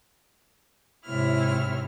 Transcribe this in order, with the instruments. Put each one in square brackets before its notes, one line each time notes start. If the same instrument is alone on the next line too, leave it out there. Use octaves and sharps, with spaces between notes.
[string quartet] G#2 C3 E4 C#5 F6